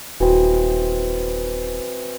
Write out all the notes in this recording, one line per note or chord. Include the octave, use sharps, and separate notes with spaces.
D#1 E3 C4 F#4 D#5